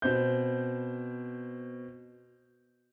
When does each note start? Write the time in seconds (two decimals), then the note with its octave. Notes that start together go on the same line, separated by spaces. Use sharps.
0.02 B2 C4 G6